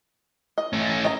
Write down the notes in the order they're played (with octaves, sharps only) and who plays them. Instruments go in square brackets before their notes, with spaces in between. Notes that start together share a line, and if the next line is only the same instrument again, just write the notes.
[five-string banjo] D#5
[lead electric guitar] A3 C#4
[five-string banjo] D#5 A#5